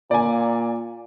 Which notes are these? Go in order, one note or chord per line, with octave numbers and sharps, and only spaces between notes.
A#2 D5 G#5